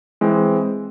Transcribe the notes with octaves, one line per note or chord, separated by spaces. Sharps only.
E3 G#3 C4